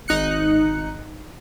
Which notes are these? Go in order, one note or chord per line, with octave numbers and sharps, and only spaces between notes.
G#1 D#4 F#6 C#7